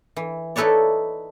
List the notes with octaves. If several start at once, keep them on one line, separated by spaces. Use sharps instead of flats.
E3
D#4 E4 A4 B4 C#5 D5